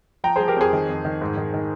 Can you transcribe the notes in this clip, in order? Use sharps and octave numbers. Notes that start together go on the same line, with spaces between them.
F3 G5 A#5
F3 G#4 C5
G4 A#4
F2 G#4 C5
D#3
F2
D#3
G#2
D#3
D#3